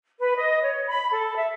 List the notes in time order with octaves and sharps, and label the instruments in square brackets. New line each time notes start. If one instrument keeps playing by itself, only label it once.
[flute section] B4
D#5
C#5
B5
A4
E5